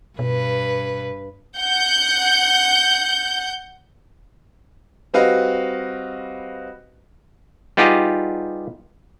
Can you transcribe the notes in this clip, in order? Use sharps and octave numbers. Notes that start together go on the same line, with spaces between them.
G2 B2 B4
F#5 G6
G3 C4 F#4 B4 D#5 F5
G3 B3 D#4 F4 G4 G#4